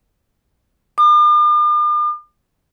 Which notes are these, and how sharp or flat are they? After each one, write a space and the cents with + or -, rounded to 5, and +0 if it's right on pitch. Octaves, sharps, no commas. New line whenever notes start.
D6 +45